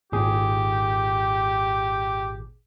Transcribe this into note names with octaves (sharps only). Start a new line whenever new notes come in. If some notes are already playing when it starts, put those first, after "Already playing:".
G#1 A#2 G4 G#4